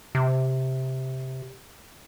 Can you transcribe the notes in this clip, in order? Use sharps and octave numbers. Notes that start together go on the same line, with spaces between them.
C3